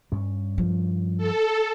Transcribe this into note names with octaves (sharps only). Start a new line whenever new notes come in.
G2 C#4
F3
A4